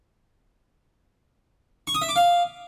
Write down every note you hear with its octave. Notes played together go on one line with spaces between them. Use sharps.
C#6
D#6
E5
D6
F5